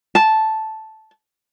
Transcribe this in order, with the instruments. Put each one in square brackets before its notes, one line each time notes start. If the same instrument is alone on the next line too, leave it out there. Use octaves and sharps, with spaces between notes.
[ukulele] A5